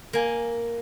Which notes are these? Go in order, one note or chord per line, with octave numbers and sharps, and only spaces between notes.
A#3 G#5